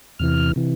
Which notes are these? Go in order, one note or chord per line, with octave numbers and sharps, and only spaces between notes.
E2 C3 E3 F6
C3 E3